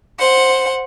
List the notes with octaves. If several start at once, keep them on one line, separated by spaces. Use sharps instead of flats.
C5 F#5